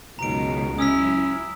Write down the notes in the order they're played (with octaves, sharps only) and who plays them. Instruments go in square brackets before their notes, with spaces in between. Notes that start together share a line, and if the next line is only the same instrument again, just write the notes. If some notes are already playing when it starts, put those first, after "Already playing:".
[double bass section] C#2 [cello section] F#2 B2 D#3 [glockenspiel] A#5 D7
[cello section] F#3 E4 [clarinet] C#4 [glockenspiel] D#6 E6 B6